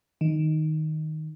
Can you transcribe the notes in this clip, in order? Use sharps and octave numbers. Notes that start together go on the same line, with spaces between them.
D#3